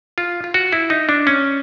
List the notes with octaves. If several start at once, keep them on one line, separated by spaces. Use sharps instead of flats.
F4
F4
F#4
E4
D#4
D4
C#4